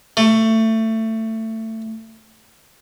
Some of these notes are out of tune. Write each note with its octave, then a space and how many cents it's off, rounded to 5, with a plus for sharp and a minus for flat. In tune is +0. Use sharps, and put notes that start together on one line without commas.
A3 +20